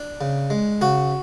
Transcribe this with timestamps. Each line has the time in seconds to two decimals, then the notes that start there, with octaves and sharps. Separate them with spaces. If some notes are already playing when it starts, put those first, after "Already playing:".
Already playing: D4
0.21 C#3
0.50 G#3
0.81 C#3 F#4